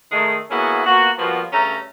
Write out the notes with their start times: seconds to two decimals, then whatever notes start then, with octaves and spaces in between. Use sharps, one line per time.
0.12 D#3 G#3 A3
0.51 A#3 B3 C#4 E4 F#4 G#4
0.85 A#3 B3 F4 F#4
1.18 F3 G3 A#3 B3 F#4
1.53 G2 C#3 A3 C#4 A#5